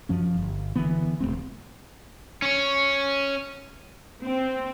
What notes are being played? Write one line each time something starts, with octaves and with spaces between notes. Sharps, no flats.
F#2 F3 C#4
G1
F#1 D3 E3 B3
D#1 A2 A3 C4
C#4 C#5
C4